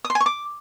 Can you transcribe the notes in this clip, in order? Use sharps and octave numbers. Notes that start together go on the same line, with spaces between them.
D#6
C6
G#5
C#6
D6